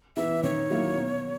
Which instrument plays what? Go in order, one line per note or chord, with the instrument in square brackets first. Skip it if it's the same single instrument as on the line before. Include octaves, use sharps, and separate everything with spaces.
[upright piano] E3 B3 E4 [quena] E5
[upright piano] D#3 [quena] C#5
[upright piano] F#3 A#3 E4
B2